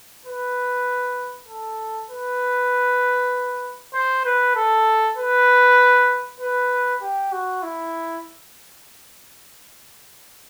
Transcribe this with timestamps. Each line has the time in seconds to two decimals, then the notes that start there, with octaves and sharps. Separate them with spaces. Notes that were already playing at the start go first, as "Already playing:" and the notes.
0.26 B4
1.48 A4
2.09 B4
3.94 C5
4.25 B4
4.55 A4
5.17 B4
6.40 B4
7.01 G4
7.32 F#4
7.63 E4